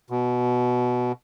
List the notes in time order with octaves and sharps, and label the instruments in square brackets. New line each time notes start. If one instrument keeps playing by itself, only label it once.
[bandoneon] B2